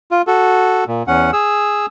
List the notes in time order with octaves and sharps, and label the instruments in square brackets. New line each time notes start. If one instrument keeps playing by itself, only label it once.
[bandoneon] F4
F#4 A4
A#2
E2 C#4 F#5
G#4 E6